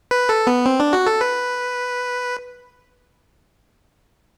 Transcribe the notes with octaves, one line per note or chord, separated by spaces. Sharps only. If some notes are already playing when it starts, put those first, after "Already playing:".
B4
A4
B3
C4
D4
F#4
A4
B4